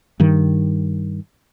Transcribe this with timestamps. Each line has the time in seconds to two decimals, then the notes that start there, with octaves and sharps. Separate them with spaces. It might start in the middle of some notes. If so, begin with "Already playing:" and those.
0.20 G2 D#3